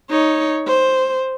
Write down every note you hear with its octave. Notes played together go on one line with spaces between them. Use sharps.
D#4 C#5
C5